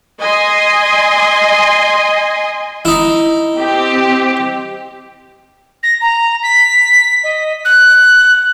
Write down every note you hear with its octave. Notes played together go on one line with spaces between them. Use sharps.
D#5 G#5 C6
D#4 E4
C4 G4
A#6
A#5
B6
D#5
F#6